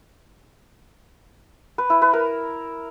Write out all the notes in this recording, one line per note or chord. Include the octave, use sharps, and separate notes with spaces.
B4
E4
B4
A#4